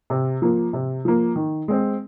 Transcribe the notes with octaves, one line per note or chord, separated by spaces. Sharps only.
C3
F3 A#3
C3
F3 A#3
D#3
G#3 C4